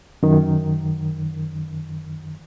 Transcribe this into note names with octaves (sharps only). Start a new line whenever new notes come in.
F#2 D#3